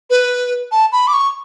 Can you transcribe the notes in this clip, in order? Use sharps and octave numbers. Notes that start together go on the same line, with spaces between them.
B4
A5
B5
D6
C#6